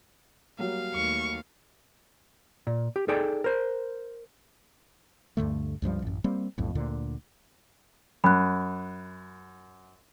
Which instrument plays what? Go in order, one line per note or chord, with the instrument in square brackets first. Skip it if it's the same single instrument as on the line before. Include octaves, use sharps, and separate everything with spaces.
[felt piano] F#3 G3 A#3 [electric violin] F5
[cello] D#2 A3 [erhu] C#6
[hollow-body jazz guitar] A#2
G4
D#4 G#4 A4 D5 G5
A#4 C5
[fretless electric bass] D2 G2 D3 A3
C#2 G2 F3 G3
A1 F#2
G3 A#3 C4
B1 F2 A2
D2 A#2 D3
[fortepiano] F#2 [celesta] B5 F#6